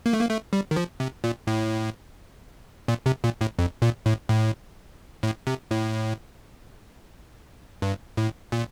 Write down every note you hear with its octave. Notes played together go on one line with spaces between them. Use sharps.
A#3
A3
A#3
A3
G3
D#3
F3
C3
A#2
A2
A#2
C3
A#2
A2
F2
A#2
A2
A2
A2
C3
A2
G2
A2
A#2